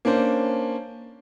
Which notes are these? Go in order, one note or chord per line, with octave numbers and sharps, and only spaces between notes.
A#3 C#4 D4 C5